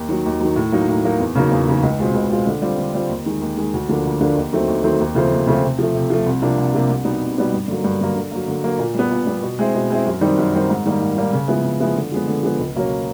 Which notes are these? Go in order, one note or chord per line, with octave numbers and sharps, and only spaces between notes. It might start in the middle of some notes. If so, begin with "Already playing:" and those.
Already playing: D#2
D#3 F#3
D#2
D#3 F#3
A2
F#3 A#3 D#4
A2
F#3 A#3 D#4
E2
C#3 F#3 A#3 D#4
E2
C#3 F#3 A#3 D#4
C#2
B2 G#3 C4 F4
C#2
B2 G#3 C4 F4
D3
G3 C4 F4
D3
G3 C4 F4
D#2
D#3 G#3
D#2
D#3 G#3
D2
D3 F3 A#3 D4
D2
D3 F3 A#3 D4
D#2
D#3 F#3 A3 C4
D#2
D#3 F#3 A3 C4
D#2
C#3 F3 A3 C4
D#2
C#3 F3 A3 C4
C3
F3 A3
C3
F3 A3
C2
C3 F3 A#3 D4
C2
C3 F3 A#3 D4
C2
B2 G3 B3 D#4
C2
B2 G3 B3 D#4
G2
D3 F#3 A#3
G2
D3 F#3 A#3
D3
F#3 A#3
D3
F#3 A#3
A#2
G3 B3
A#2
G3 B3
B2
G#3 C4 E4
B2
G#3 C4 E4
F#2
D#3 G3 C4 D#4
F#2
D#3 G3 C4 D#4
G#2
D#3 G3 A#3
G#2
D#3 G3 A#3
C#3
F3 G#3 B3 E4
C#3
F3 G#3 B3 E4
D3
F3 G#3 B3
D3
F3 G#3 B3
C#2
B2 F#3 A#3 C#4